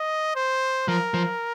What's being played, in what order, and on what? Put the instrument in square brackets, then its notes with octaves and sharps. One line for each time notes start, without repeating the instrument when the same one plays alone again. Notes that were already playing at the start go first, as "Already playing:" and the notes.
Already playing: [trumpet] D#5
C5
[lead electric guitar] F3 [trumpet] A#4
[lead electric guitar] F3